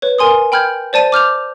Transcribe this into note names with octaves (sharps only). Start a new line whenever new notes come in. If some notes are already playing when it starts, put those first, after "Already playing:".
B4 C#5
A#4 G#5 C6 D#6
G5 B5 F6 G6 G#6
C5 D5 A5 D#7
D6 F6 G6 F7